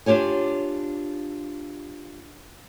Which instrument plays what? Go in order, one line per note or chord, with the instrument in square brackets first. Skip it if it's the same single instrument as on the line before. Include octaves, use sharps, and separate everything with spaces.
[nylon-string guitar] D4 F4 G4 C#5 G#5